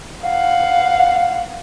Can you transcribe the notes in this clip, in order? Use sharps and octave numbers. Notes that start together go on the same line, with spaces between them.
F5 F#5